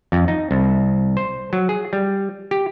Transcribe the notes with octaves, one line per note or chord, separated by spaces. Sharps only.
F2
D#4
C2
C5
F#3
G#4
G3
G4